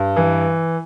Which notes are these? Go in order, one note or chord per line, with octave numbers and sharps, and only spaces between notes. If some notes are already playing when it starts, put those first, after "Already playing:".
Already playing: G2
E3